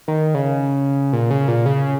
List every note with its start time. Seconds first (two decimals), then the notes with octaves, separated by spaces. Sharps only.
0.08 D#3
0.34 C#3
1.13 A#2
1.31 C#3
1.48 A#2
1.66 C#3